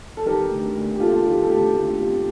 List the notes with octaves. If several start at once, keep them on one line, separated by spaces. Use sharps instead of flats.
A4
D#3 G4 A#4
D2
D2
G4
C3 F4 A4
D#3 G4
A4
D2 G4
D2 F4
C3 G4